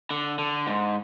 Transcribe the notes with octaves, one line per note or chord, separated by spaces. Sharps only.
D3
D3
G#2